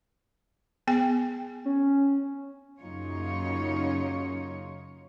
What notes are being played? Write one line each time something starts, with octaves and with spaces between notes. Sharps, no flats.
B3 G#4 G5
C#4
F#2 C#3 A#3 D#4 F4 C#5